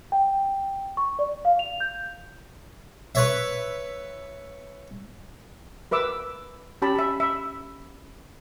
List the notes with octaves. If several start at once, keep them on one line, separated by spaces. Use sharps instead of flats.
G5
C#6
D5
F5
F7
G6
B4 C#5 E5
A#4 B4 E5 D6 E6
C#4 G4 A5 B5
E5 B5
E5 B5